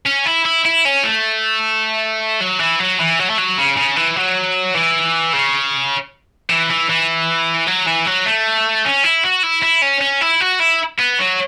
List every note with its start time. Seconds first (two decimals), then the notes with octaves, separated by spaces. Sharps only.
0.06 C#4
0.26 E4
0.45 E4
0.65 E4
0.85 C#4
1.04 A3
2.41 F#3
2.60 E3
2.80 F#3
3.00 E3
3.19 F#3
3.30 A3
3.38 F#3
3.58 C#3
3.77 C#3
3.96 E3
4.16 F#3
4.74 E3
5.33 C#3
6.50 E3
6.70 E3
6.90 E3
7.67 F#3
7.87 E3
8.07 F#3
8.26 A3
8.85 C#4
9.04 E4
9.24 F#4
9.43 E4
9.63 E4
9.82 C#4
10.01 C#4
10.21 E4
10.41 F#4
10.60 E4
10.99 B3
11.19 F#3